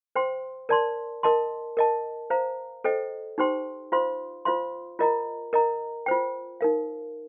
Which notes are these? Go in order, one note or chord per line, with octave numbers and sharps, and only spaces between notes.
C5 G5 C6
A#4 D5 A5 C6
A#4 D#5 A5 C6
A#4 D#5 A5
C5 F5 A#5
A4 C5 D#5 G5
D#4 G4 C5 G5 C6
F4 C5 F5 C6
F4 C5 F5 C6
F4 A#4 D#5 A#5
A#4 D#5 A#5
F4 C5 G5
D#4 A#4 F5